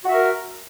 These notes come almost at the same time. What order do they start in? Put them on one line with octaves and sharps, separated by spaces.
F#4 E5 A#4